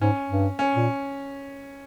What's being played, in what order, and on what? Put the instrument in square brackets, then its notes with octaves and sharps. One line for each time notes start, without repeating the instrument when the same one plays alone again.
[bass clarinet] G#2 [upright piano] C#4
[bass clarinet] G2
[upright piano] C#4
[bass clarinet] A#2